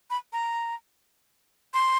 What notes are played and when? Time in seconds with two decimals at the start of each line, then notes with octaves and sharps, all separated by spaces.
0.10 B5
0.33 A#5
1.74 C6